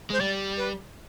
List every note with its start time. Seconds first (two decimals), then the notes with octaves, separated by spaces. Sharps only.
0.10 G#3 C5
0.20 G3 D5
0.57 B4